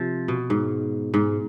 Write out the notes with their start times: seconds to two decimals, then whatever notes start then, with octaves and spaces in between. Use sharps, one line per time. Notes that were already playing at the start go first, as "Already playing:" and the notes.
Already playing: C3 F3
0.28 B2
0.50 G#2
1.14 G#2